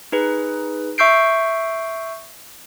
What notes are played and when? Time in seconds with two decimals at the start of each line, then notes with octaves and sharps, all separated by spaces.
0.12 D#4 G#4 B4
0.98 E5 C#6 E6 G6 C7 D7